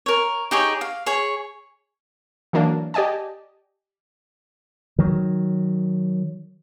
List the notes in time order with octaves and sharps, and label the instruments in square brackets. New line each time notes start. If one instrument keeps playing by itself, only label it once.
[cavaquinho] A#4 C#5
D#4 G4 G#4 C#5
F5
G#4 C#5 C#6
[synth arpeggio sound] E3 F#3 A#3 D4
G4 D5 D#5 G#5 A5
[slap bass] D#3 F#3